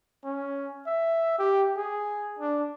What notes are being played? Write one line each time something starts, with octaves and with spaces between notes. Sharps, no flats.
C#4
E5
G4
G#4
D4